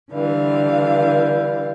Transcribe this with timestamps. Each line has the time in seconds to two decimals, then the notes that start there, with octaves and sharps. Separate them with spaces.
0.12 D3 E3 G3 F5